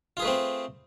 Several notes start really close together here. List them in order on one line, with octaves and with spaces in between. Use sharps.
F4 G#4 B4 A3 C4